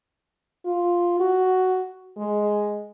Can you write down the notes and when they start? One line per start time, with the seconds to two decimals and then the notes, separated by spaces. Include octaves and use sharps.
0.66 F4
1.20 F#4
2.17 G#3